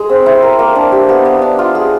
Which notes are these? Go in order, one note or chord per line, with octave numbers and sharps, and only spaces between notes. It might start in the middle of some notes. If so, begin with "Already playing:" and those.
Already playing: G#3 G#4
C4
E4
A#4
A#3
D4
G4
B3
B3
D4
F4
G#4